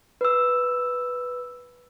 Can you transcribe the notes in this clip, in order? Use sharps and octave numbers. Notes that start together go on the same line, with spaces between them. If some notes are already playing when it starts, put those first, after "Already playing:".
B4 E6